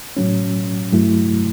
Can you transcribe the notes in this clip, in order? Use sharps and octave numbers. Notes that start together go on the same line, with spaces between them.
A2 F#3 C#4
G2 F#3 A3 E4